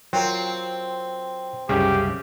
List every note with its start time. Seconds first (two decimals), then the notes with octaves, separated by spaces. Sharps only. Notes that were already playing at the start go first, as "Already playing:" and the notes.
0.13 F#3 C4 F4 A#4
1.69 C2 F#2 C#3 G3 G4